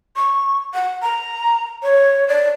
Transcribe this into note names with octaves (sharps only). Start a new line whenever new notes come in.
C#6
F#5
A#5
C#5
D5